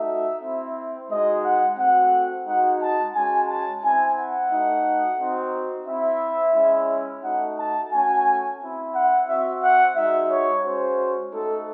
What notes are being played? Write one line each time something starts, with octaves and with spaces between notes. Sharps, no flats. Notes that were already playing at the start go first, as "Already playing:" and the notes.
Already playing: A3 D#4 F#4 E5
C4 E4
G#3 D#4 F#4 D#5
F#5
A3 C4 F#4 F#5
G#3 D#4 F#4 F#5
A5
G#3 C#4 F#4 G#5
A5
C4 E4 G#5
F#5
A3 D#4 F#4
C4 D#4 F#4
C4 E4 E5
G#3 C#4 E4
A3 D#4 F#4 F#5
A5
A3 C#4 F#4 G#5
C4 E4
F#5
C4 F#4 E5
F#5
G#3 D#4 F#4 E5
C#5
G#3 C#4 F#4 C5
A3 D#4 F#4 A4